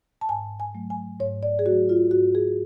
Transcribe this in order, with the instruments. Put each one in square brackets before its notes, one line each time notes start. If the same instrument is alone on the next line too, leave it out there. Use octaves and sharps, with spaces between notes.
[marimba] A5
G#2 G#5
G#5
F#3 A3
G#5
G#2 C#5
D5
G#4
A3 F#4
F#3
F4
G#2 F#4
G#4